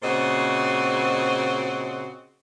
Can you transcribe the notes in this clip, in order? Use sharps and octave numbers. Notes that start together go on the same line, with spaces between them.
A#2 C#3 C4 F#4 C5 D#5